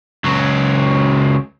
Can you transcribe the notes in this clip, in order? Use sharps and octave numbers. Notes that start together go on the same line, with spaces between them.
C#2 F#3